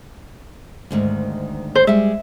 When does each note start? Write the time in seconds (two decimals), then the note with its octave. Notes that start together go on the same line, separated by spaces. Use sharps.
0.91 D2 G#2 D#3
1.75 C5
1.87 G3 G#3 E5